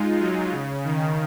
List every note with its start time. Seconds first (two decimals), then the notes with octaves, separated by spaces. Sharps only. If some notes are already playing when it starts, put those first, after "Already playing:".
Already playing: G#3 D#4 F4
0.19 F#3
0.52 C#3
0.84 D#3